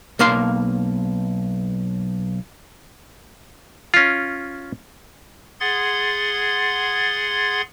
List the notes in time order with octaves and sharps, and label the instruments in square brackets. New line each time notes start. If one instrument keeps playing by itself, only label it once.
[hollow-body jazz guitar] B1 A#3 F5 C6
[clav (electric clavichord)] C#4 F4
[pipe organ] G#4 F#5 C6 G#6 A6